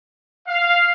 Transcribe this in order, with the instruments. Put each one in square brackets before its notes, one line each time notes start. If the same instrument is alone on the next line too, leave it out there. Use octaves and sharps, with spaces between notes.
[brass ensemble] F5